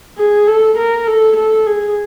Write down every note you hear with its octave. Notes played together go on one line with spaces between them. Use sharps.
G#4
A4
A#4
A4
A4
G#4